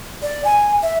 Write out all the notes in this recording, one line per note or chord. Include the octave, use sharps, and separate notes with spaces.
D5
G#5
E5